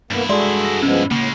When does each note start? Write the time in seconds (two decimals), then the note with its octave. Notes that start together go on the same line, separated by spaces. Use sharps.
0.11 G2 A#3 B3 E4
0.29 G#3 F#4 G#4 A4 D5 C6
0.65 A#6
0.83 F3 G#3 B3 C#4
1.11 A2 C#3 G#3 A#3